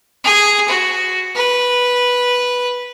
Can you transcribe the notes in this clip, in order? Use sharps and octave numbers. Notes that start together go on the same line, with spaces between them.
G#4
F#4
B4